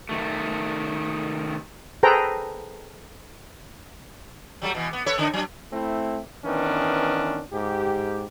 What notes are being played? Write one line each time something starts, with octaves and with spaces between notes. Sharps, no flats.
C3 D#3 A3
G#4 A4 B4 C5 G5 A#5
F#3 G3 A3
B2 E3
B3
A4 B4 C#5
D3 D4 D#4
F#3 D4
A3 C4 E4
D#3 E3 B3 C#4 D4
G#2 G4